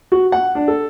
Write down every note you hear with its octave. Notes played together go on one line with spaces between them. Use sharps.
F#4
F#5
D4
A4